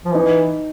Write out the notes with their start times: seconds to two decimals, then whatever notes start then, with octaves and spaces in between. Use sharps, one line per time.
0.05 F3
0.14 E3 D#4